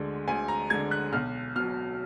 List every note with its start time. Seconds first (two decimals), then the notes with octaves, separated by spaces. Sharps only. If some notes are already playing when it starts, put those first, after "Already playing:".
Already playing: D2 D3 G#3
0.28 D2 G#5
0.48 A#5
0.70 D3 G#3 G#6
0.91 F#6
1.13 B1 F6
1.56 B2 F#3 F6